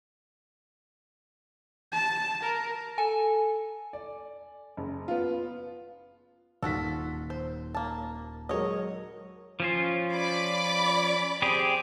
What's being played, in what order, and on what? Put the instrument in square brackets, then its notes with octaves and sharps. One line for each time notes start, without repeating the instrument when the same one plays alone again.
[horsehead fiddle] A5
A#4
[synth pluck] A4 [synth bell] G#5
[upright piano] D5
F#1
B3 F4
[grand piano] D#1 D#3 B6 [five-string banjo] F4 F#4 A4
[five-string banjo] C5
A#3 A5
[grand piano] F#3 G#3 A#4 [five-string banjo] C#5 D#5
[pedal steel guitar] F3 C#4 F4
[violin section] D5 B5 D6
[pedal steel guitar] C4 G4 G#4